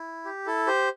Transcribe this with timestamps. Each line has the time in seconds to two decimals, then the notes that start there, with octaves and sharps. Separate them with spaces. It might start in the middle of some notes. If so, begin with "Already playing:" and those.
Already playing: E4
0.25 G4
0.46 E4 A4
0.67 G4 C5